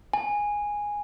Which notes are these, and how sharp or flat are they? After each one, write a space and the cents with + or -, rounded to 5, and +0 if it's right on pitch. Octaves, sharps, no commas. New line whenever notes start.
G#5 -5